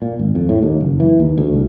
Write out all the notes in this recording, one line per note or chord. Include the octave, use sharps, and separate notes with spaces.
A#2
G#1
F2
A2
D#2
F#1
E3
D#2
D2
C2